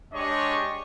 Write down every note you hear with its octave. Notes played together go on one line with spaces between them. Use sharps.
G#3 D4 G4 C#5 D#5 C#6